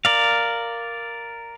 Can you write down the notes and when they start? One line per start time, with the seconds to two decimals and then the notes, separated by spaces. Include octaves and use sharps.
0.05 A#4 D5 F5